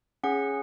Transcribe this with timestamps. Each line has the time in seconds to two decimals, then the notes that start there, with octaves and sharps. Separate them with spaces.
0.24 C#4 G#4 F#5